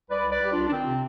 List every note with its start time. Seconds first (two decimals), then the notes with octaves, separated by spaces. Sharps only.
0.10 C2 B4 D5
0.25 C2
0.30 B4 D5
0.40 G3 G4
0.50 D4 F4
0.56 C2
0.67 D4
0.71 D#3 C4
0.86 C3